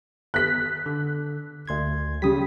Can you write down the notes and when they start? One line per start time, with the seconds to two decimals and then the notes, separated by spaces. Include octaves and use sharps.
0.34 F#6 B6
0.86 D3
1.68 D2 C6 G#6
2.22 C#3 G3 D#6 B6